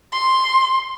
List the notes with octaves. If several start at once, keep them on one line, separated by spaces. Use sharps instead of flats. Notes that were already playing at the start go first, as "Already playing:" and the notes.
C6